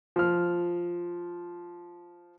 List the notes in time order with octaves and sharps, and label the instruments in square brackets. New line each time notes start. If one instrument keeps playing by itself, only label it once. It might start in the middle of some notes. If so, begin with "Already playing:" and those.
[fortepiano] F3 F6